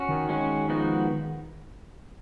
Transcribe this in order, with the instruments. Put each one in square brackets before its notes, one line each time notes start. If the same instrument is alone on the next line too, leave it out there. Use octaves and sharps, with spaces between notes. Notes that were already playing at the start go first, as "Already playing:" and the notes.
Already playing: [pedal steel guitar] C#4 F#4
[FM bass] D#3
[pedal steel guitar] G#3 C#4 F#4
F3 G#3 B3 D#4 F#4